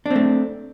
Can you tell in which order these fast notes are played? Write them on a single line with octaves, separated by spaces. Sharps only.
D4 C4 A3